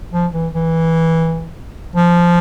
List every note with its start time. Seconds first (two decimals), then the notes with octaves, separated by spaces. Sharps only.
0.12 F3
0.33 E3
0.54 E3
1.96 F3